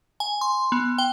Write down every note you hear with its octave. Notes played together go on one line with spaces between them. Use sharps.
G#5
C6
B3
G5